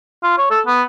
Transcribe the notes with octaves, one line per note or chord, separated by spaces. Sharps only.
F4
C#5
A4
B3